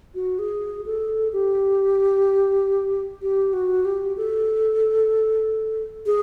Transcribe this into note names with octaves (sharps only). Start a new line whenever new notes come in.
F#4
G#4
A4
G4
G4
F#4
G4
A4
G#4